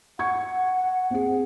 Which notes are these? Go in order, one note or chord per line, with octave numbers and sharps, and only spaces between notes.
F#5 C#6 G#6
C4 G#4